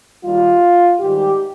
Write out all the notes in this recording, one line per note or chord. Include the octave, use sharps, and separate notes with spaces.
D#2 D#3 G3 F4
G#2 D#3 G3 G4